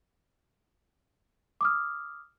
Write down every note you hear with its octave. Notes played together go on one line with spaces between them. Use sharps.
D6 D#6 F6